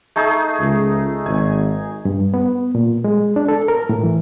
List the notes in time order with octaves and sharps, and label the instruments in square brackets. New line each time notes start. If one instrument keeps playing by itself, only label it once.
[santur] A3 D#4 G#4
[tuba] C#2
[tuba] G#1 [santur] G#5
[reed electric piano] G2
B3
A#2
G#3
D4
A4
A#4
A2
E3